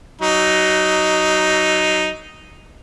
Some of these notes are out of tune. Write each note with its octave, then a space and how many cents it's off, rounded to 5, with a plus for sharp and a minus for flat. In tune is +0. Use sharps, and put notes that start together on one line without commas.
F#3 +25 D#4 +0